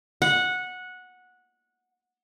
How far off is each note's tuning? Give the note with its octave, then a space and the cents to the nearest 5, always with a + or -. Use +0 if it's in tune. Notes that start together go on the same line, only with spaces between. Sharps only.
F#5 -15